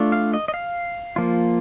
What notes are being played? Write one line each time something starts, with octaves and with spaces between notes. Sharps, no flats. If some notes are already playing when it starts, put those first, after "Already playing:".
Already playing: A3 D4 F4
F5
D#5
D#5
F5
F3 A#3 F4